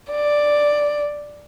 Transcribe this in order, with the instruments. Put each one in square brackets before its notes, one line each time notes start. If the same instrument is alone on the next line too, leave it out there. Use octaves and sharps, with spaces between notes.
[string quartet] D5